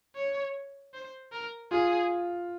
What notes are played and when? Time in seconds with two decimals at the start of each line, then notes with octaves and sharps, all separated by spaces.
0.15 C#5
0.93 C5
1.32 A#4
1.71 F4 G#4